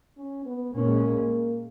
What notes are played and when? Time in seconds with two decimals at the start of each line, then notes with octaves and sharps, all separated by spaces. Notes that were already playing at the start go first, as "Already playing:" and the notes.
0.17 C#4
0.46 B3
0.74 A#2 G#3 A#3 C#4